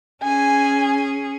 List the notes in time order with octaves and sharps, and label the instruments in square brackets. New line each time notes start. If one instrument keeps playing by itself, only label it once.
[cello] C#4 G#4 [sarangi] G#5